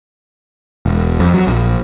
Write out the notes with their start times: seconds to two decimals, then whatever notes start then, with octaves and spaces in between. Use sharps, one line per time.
0.86 E1
1.20 F2
1.34 F#3
1.47 A#1